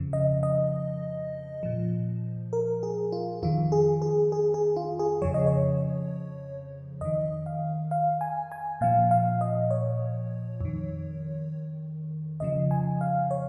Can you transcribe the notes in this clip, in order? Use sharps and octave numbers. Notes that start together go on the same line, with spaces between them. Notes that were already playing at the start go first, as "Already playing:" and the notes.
Already playing: F2 C#3 F3
D#5
D#5
A#2 F3
A#4
G#4
F4
F2 D#3 F4
G#4
G#4
G#4
G#4
F4
G#4
F2 C#3 F3 C#5
D#5
C#5
F2 D#3 D#5
F5
F5
G#5
G#5
A#2 F3 F5
F5
D#5
C#5
F2 D#3
F2 C#3 F3 D#5
G#5
F5
C#5